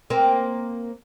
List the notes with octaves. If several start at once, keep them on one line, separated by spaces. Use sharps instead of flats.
A#3 C4